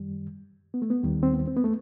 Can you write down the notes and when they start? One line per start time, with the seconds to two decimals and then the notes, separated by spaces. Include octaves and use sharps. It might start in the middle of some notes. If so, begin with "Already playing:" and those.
Already playing: F#2 D#3 G3
0.74 B3
0.82 A3
0.90 B3
1.03 D#2 D#3 G3
1.23 C4
1.34 B3
1.48 C4
1.57 B3
1.64 A3